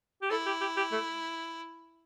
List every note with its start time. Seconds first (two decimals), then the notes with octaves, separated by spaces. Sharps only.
0.22 G4
0.30 E4 A4
0.46 G4
0.61 G4
0.77 G4
0.92 A3